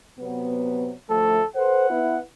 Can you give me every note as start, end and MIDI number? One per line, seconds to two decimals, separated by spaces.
0.19 0.92 48
0.19 0.92 54
0.19 0.92 59
1.10 1.40 38
1.10 1.40 53
1.10 1.40 57
1.10 1.47 69
1.56 1.86 69
1.56 1.86 71
1.56 1.86 72
1.56 2.20 78
1.90 2.18 59
1.90 2.18 64